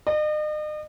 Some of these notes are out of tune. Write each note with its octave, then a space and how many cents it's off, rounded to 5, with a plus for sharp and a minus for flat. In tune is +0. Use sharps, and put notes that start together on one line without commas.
D#5 -40